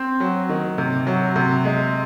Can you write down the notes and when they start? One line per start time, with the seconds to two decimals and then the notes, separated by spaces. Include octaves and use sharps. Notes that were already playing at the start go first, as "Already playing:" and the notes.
Already playing: C4
0.20 F#3
0.49 D#3
0.78 C3
1.07 F#3
1.36 C3
1.65 G#3